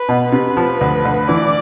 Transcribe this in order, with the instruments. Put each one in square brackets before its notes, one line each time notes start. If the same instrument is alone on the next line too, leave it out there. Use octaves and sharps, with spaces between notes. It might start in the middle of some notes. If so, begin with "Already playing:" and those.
Already playing: [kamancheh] B4
[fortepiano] B2
[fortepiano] C3 [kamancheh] B4
[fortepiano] F3
D2
D2
[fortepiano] E3 [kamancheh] D5